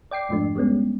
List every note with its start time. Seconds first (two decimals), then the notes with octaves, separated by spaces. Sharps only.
0.11 D5 G5 D6 C7
0.29 F2 G#2 F3 A3 D4
0.55 G3 G#3 B3 C#4